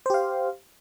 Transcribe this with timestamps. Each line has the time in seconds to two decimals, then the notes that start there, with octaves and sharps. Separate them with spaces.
0.06 C5
0.10 G4
0.14 F5